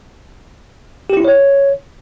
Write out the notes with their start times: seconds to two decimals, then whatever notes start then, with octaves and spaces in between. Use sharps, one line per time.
1.10 G4
1.17 E4
1.25 C#5